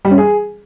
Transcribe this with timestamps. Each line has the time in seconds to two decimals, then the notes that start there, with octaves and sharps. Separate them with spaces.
0.05 G3
0.11 C#4
0.18 G#4